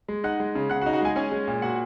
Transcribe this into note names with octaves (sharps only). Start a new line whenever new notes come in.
G#3
D#4 F#5 F#6
G#3
C#3
C#3 F#5 F#6
F#4 F#5
D#4
F#4 F#5
G#3 G#4 G#5
C#4 G#4 G#5
G#3
A#2
A#2 F#4 F#5